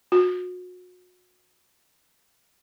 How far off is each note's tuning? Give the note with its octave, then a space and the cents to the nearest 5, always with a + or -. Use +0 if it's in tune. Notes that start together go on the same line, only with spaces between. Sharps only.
F#4 -35